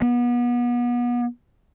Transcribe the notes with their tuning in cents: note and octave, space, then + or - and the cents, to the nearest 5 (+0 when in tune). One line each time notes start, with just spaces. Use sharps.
B3 -30